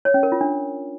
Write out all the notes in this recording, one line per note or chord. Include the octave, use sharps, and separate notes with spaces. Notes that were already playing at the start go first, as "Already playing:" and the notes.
C#5
C#4
A#4
F4
D4